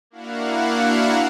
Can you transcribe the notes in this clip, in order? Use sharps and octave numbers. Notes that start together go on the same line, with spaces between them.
A#3 D4 E4 F#4 F5 F#5